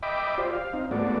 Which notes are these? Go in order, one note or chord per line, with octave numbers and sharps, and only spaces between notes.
D#5 E5 G5 B5 D6
F4 G4 C5 D5
F5
C4 D#4
G#2 A3 B3 F#4 D5